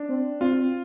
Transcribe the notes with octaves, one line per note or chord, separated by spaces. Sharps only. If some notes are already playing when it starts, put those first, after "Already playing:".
Already playing: D4
C4
C4 F4